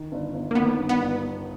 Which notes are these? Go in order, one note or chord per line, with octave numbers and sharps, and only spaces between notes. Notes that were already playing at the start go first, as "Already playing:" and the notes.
Already playing: D#3
G1
G1
A#3
D#3 B3
G2
B3
G1